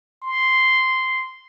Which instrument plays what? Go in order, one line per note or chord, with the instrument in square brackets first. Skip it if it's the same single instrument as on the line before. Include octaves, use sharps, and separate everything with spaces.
[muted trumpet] C6